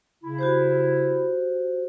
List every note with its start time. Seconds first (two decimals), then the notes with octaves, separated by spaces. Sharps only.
0.23 C#3 E4
0.39 F#4 G4 C5